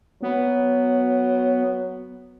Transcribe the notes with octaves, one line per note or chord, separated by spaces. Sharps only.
F#3 B3